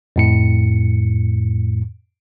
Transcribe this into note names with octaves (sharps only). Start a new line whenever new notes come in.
F2 A2 C#7